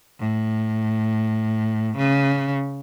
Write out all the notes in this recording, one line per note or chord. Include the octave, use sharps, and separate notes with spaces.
A2
C#3